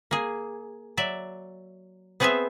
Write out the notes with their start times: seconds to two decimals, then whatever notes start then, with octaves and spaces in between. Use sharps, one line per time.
0.11 A#3 G#4
0.97 F#3 D5 E5
2.20 B3 C4 G#4 B4 C5 E5